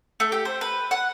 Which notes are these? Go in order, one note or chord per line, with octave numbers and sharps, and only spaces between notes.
A3
G4
C5
B4
F#5